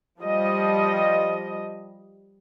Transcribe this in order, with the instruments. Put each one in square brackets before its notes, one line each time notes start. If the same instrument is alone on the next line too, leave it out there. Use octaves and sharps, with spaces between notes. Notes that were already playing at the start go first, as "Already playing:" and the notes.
[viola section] F3 G3 D#5